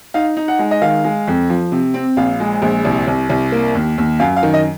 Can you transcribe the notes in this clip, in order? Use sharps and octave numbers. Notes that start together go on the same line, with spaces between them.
D#4 F5
D#4
F#5
G#3
D#5
D#3 F5
G#3
F2
F3
C3
C4
A#1 F5
G#3
A#1
C2
C2
C2
A#3
D#2
D#2
F#2 F5
F5
D#3
D#5